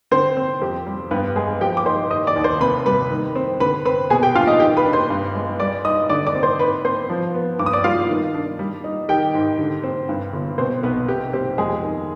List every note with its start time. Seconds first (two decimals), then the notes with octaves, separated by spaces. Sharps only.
0.11 D3 C4 C5
0.37 C4
0.61 F2 G4
0.86 G3
1.11 G2 B3 B4
1.36 G#3 G#4
1.61 F3 G4 G5
1.77 D6
1.86 D#4 C5 C6
2.10 D#3 D#5 D#6
2.27 D5 D6
2.36 D#2
2.44 C5 C6
2.60 C3 B4 B5
2.86 G3 B4 B5
3.10 D#3
3.35 C4
3.60 D3 B4 B5
3.85 C4 B4 B5
4.10 B2 G#4 G#5
4.23 G4 G5
4.35 D4 F4 F5
4.47 D#4 D#5
4.60 D#3 G4 G5
4.77 B4 B5
4.85 D4
4.93 C5 C6
5.10 G2
5.35 G#3
5.60 G3 D5 D6
5.85 D#4 D#5 D#6
6.10 D3 D5 D6
6.27 D5 D6
6.35 C4
6.43 C5 C6
6.59 G#2 B4 B5
6.85 C4 C5 C6
7.10 F3
7.34 B3
7.59 G2 D6
7.66 D#6
7.73 D5 D6
7.84 G3 F4 F5
8.09 D#3
8.34 D4
8.59 G3
8.84 D#4
9.09 D#3 G4 G5
9.34 G#2
9.59 D3
9.84 C4
10.09 G2
10.33 G1
10.58 B2 C4 C5
10.83 B1 B3 B4
11.08 C3 G4
11.33 C4 G4
11.58 F2 G#3 G#4
11.83 D#3